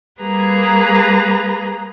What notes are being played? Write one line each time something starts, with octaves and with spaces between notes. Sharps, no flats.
G3 A#3 G#4 B4 A#5